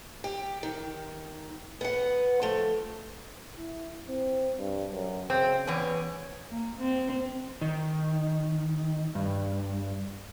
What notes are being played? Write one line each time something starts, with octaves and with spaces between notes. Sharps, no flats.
G4
D#3
B3 F#5
F3 A3
E4
C4
G2
F#2
C#3 C4
E2 B3 C#4
A#3
C4
D#3
G2